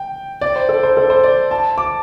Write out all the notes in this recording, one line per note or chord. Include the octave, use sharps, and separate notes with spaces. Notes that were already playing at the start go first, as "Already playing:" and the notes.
Already playing: G5
D5
C5
A4
C5
A4
C5
D5
A5
D6